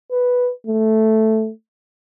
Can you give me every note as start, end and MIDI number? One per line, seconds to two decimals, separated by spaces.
0.12 0.51 71
0.67 1.51 57